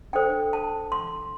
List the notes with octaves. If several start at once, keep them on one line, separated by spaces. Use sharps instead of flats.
D4 A4 C5 G5
A5
C6